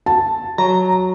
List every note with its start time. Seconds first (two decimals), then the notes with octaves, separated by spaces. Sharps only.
0.06 A5
0.58 F#3 A#5